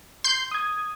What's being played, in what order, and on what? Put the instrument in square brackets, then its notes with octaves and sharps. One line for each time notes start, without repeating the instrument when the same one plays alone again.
[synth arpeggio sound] C6 G6
[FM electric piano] D#6 G#6